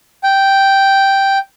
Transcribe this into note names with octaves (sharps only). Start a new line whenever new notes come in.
G5